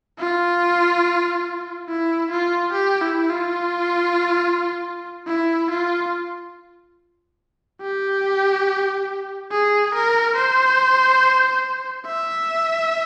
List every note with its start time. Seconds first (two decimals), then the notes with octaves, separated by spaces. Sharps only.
0.19 F4
1.89 E4
2.31 F4
2.73 G4
3.01 E4
3.30 F4
5.27 E4
5.70 F4
7.81 G4
9.51 G#4
9.94 A#4
10.36 C5
12.06 E5